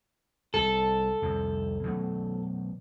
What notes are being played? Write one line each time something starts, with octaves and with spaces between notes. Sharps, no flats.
C2 A4
C2 F2 C3
B2 F#3 A3